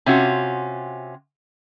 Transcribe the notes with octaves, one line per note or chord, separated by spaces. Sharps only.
C3 C#4 F4 F#4